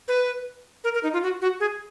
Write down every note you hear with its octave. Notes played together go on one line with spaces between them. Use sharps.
B4
A#4
A#4
D#4
F4
F#4
F#4
G#4